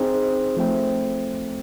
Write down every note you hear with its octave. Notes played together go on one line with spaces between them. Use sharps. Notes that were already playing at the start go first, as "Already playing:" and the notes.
Already playing: C4 D#4 G#4 C5
F3 A3 C4